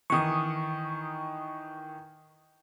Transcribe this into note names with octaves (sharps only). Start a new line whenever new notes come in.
D#3 E3 C#6 D#6